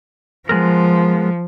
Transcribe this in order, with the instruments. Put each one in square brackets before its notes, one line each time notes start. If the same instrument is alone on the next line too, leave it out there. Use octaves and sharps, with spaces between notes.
[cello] F3 [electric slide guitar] G#3 B3 A#4